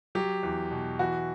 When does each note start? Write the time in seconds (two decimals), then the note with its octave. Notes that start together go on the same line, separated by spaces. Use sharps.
0.15 F#3 G4
0.43 E2
0.71 B2
0.99 E3 F#4